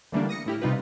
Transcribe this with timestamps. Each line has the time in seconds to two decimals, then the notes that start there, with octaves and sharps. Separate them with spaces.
0.12 D3 E3 G3 A3 A#3 D4
0.29 D#6 A#6 C#7
0.46 A2 E4 G4 F6
0.61 C3 G3 D#4 F4 G4 B4